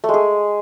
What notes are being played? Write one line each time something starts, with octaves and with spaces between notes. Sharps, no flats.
A3
G#3
G#4